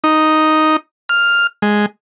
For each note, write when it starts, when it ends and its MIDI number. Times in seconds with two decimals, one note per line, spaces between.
0.04 0.77 63
1.09 1.47 89
1.62 1.86 56